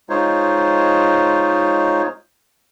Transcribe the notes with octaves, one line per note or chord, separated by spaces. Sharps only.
G#3 D#4 F4 C5 C#5